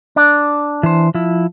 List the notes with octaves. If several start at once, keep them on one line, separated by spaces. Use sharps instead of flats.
D4
E3 C5
F3 E4